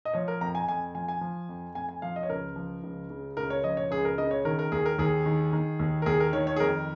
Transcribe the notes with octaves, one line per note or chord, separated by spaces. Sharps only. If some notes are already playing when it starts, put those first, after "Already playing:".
D#5
F3 C#5
A#4
F2 A#5
G#5
F2 G#5
F3 G#5
G#5
F3
F2
F2 G#5
G#5
F3 F5
D#5
C#5
C#2 A#4
F3
C#2
C#3
C#2 A#4
C#5
F3 D#5
C#5
C#2 G#4
A#4
C#3 D#5
C#5
D#3 A#4
A#4
D#2 G#4
A#4
D#2 G#4
D#3
D#3
D#2
A#4
D#2 G#4
A#4
D#3 C#5
C#5
G#4
F2 A#4